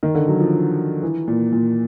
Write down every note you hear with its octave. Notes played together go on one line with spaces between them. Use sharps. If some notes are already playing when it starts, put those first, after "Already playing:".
D#3
D3
F#3
F3
E3
A#2
A#2